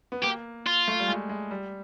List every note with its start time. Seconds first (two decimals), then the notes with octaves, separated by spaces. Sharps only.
0.12 B3
0.24 A#3 G4
0.67 F4
0.88 A3
1.00 G3
1.08 G#3
1.29 G#3
1.51 G3